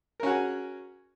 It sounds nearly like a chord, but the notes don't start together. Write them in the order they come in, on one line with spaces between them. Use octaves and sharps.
A#4 C#4 F#4 G#4